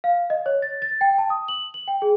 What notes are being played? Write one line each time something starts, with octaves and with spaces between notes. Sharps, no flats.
F5
D#5
C#5
A6
A6
G5
A5
D#6
F#7
F#7
G5
G#4